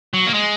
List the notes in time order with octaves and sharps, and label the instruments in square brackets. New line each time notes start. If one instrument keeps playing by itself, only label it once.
[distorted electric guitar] F#3
A#3
G#3